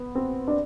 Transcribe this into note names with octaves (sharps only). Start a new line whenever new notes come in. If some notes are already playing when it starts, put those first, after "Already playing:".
Already playing: B3
C4
D4